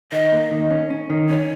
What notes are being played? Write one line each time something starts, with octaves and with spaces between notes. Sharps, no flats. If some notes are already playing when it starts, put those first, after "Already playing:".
D#3 D#5
A#3
D#3
C#4
C#4
D#3
C#4 C#5